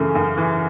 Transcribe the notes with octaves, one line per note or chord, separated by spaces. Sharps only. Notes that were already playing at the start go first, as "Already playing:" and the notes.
Already playing: F#2 C#3 E3 A3
F#2
E3